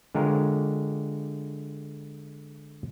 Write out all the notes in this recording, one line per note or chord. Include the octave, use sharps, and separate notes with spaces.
D3 G#3 F4 G4 A#4 C#5